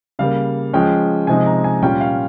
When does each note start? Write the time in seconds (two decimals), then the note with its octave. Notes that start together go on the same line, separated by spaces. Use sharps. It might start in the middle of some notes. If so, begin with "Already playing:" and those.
0.19 C#3 G3 A#3 F5
0.73 F3 G#3 C#4 G5
1.27 C3 F3 G#3 D#4 G#5
1.46 A#5
1.64 G#5
1.82 A#2 G3 C#4 F4 G5
2.01 F5